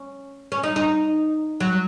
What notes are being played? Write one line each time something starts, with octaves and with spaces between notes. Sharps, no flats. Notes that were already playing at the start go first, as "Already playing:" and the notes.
Already playing: C#4
C#4
D#4
D#4
F#3